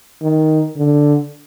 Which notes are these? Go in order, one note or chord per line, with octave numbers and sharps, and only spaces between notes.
D#3
D3